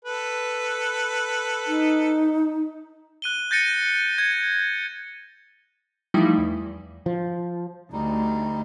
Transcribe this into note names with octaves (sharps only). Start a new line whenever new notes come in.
A4 B4
D#4
F#6 D#7 G7
G6 A6 A#6 C#7 D#7
G#6
E3 F3 G3 A3 D#4 E4
E2
F3
D2 G3 D#4